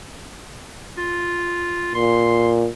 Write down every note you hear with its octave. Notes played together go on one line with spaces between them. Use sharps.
F4
A#2 C6